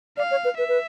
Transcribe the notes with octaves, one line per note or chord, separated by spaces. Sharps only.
D5 F5
C#5
B4
B4 E5
B4